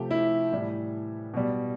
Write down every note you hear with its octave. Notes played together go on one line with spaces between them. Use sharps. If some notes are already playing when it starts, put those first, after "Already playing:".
Already playing: C3 F3 A3 G4
E4
A2 E3 G3
B2 G3